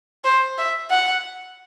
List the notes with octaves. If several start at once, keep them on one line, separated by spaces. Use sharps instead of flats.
C5
E5
F#5